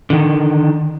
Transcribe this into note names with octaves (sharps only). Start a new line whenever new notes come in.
D3 D#3